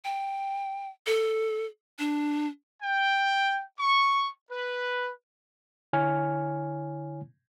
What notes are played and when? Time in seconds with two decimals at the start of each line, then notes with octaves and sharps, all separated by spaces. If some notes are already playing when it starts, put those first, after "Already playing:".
0.05 G5
1.06 A4
1.99 D4
2.83 G5
3.79 C#6
4.49 B4
5.93 D3 E4 C#5 G#5 F6